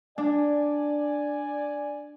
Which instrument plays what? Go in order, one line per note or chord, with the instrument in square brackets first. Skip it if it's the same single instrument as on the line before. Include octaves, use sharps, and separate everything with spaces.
[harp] D4 [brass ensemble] D5 G#5